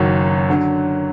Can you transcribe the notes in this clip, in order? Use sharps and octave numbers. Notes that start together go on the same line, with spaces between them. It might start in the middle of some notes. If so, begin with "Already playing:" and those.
Already playing: F#1 F#2 D#3 F#3
D3 F#3